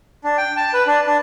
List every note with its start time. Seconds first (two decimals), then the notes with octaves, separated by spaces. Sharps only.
0.24 D4
0.38 G5
0.57 A5
0.73 B4
0.87 D4
1.06 D4